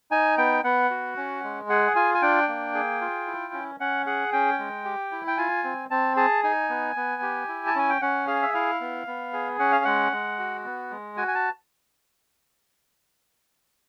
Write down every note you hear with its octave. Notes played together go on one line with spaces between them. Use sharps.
D#4 G#5
B3 G5
B3 F#5
F#4
C#4
G#3
G#4 F#5
F4 G#5
G#5
D4 G5
A#3
G#4
F4
E4
C#4
C#4 F#5
G#4 F#5
C#4 G5
G#3
G4
E4
G5
F4 G#5
C4
C4 A5
G#4 A5
D#4 G#5
B3
B3
G4
E4
A5
C#4 G#5
G5
C#4 F#5
G#4 F5
E5
E4 F5
B3
B3
G#4
C#4 F#5
F5
G#3 F#5
G#3
F#4
B3
G#3
F#4 G#5
G#5
A5